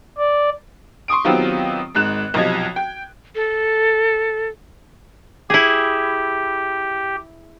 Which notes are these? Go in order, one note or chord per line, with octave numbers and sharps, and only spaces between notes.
D5
C6 C#6 D#6 D7
D#3 F#3 B3 C4 F4 G4
G#1 G#2 F#6 E7
B1 C3 F3 D#5 G#6
G5
A4
E4 G4 G#4